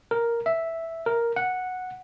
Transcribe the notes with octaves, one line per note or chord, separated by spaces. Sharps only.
A#4
E5
A#4
F#5